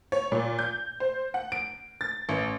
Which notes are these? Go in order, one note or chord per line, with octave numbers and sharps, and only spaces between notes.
C#5
A#2
G6
C5
F#5
D7
A6
A1